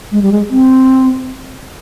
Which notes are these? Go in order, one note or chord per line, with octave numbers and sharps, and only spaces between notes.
G#3
G3
G#3
C4